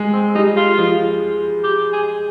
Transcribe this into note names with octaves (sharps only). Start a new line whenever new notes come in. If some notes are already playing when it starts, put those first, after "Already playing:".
Already playing: G#3
C4
G3 D#4
F4
F3
G4
G#4